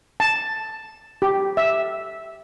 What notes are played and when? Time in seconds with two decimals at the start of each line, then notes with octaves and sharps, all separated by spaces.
0.20 A5
1.22 G4
1.57 E5